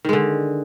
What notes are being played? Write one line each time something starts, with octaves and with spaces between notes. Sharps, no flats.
D3 D#3 G#3